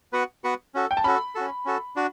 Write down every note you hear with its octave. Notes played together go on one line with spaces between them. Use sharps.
B3 F#4 B4 F#5
B3 F#4 B4 F#5
C#4 F#4 A4
G5
A5
C#4 F#4 A4 B5
C#4 F#4 A4
C#4 F#4 A4
D4 F#4